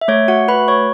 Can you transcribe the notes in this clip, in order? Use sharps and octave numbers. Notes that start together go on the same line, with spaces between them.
E5
A3 C#5
F#4 F#5
F#4 B4 B5
C#5 C#6